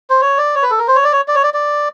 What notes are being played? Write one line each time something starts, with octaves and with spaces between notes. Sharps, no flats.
C5
C#5
D5
C#5
B4
A4
A#4
C5
C#5
D5
C#5
D5
C#5
D5
D5